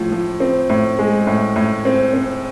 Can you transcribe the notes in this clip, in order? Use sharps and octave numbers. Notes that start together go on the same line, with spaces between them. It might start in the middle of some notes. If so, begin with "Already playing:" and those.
Already playing: A2 F3
F3
C4
A2
G#3
A2
A2
C4
C4